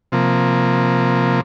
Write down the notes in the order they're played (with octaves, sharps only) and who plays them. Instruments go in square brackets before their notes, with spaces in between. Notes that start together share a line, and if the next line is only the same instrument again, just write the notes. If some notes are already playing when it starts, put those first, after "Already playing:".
[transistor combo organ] C3 F3 A#3